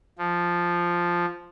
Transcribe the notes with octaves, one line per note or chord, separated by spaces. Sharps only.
F3